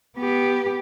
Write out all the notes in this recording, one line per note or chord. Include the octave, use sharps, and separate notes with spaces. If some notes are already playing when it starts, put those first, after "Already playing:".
B3 G4